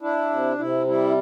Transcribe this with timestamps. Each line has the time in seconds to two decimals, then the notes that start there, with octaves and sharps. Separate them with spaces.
0.01 D4 E4
0.30 C3
0.58 C3 E4
0.87 G3 E4